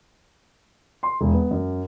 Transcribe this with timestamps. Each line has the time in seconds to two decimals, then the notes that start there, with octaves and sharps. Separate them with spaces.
1.03 C6
1.21 E1
1.34 B3
1.51 F#2